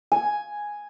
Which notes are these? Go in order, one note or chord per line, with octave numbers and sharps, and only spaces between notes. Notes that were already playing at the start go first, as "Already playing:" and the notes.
G#5